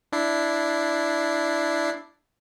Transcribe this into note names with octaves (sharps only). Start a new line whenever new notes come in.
D4 E4 C7